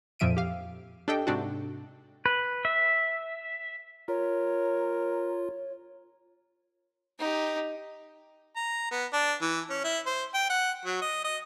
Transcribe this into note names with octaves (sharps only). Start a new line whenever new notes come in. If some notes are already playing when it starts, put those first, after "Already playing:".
F2 A#2 F3 E5 D7 D#7
G4 F5
D4 G4 A4 D#5 G5
G#2 C3 D4 F#4
B4
E5
F4 A#4 C#5
D#4 G4
A#5
B3
D4
E3
C#4
E4
C5
G5
F#5
F#3
D#5
D#5